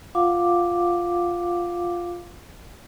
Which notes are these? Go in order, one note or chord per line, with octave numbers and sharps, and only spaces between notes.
F4 F5 F#5 D6